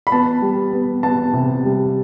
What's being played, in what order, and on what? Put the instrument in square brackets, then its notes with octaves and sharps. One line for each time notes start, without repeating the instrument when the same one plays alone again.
[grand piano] B5
B3 A5
G3
B3
B3 A5
C3
G3